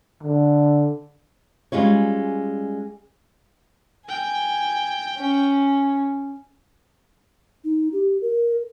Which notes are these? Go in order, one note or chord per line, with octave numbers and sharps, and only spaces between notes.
D3
G3 G#3 C#4 F4 C#5
G5 G#5
C#4
D#4
G4
A#4